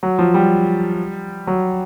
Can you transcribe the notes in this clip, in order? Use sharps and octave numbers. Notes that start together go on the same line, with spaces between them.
F#3
F3
G3
F#3